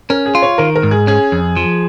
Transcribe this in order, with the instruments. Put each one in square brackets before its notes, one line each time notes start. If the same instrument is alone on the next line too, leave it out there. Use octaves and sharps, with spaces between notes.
[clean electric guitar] C#4 [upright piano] A#4
[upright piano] G#4
[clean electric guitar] F4
[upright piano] C#5
[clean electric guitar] D#3 [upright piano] A#4
[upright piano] A#4
[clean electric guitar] G#2
[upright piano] G#4
[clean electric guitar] C#4 [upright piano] G#4
[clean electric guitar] F2
F3